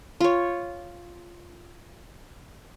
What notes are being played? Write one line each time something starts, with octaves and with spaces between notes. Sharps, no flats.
F4 C#5